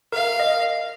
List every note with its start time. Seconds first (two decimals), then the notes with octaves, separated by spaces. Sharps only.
0.12 A#4 F5
0.40 D#5